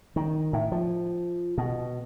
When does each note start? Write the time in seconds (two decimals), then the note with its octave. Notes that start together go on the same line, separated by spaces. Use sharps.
0.16 D#3
0.53 A2
0.72 F3
1.58 B2